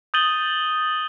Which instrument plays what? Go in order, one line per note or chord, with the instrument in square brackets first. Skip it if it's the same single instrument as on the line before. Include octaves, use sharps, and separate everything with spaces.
[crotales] D#6 G6 A6 D#7 F#7 G7